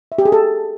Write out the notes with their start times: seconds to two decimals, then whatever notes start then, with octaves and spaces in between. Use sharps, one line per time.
0.12 E5
0.18 G4
0.25 G#4
0.32 A4